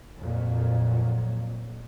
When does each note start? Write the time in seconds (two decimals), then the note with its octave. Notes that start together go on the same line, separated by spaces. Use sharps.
0.20 F2 A#2 F#3